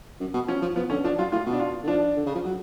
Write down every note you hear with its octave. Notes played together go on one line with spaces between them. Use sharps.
F#2
B2
F3 C#4
F3
F3 B3
D3 C#4
F3 D4
F#3 F4
A2 F4
B2
D4
F4
D3
F3 D4
D3
C#3
F3
F#3